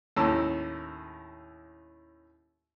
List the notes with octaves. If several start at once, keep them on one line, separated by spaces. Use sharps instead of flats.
D#2 A2 C#4 A4 A#5 E6